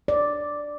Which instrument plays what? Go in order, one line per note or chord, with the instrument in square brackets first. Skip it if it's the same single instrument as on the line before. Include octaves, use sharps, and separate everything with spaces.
[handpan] D5